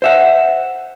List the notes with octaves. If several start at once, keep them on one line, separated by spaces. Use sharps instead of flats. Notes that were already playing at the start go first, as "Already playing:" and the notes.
C5 E5 F#5